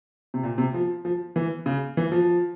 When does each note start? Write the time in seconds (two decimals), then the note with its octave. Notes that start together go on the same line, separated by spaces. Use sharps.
0.34 C3
0.43 A#2
0.58 C3
0.74 F3
1.05 F3
1.36 E3
1.66 C#3
1.97 E3
2.12 F3